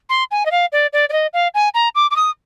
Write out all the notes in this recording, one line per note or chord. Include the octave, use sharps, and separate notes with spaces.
C6
G#5
D#5
F5
D5
D5
D5
D#5
F5
G#5
A#5
D6
D6
D#6